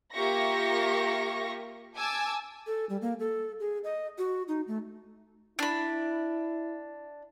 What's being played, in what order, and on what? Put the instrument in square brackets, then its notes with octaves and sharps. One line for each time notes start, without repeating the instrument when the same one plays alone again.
[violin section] A#3 F4 G4 E5 C#6 A#6
G#5 A5 D6 E6
[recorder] A4
G3
A#3
A4
G#4
D#5
F#4
D#4
A3
[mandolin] D4 B5 [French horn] E4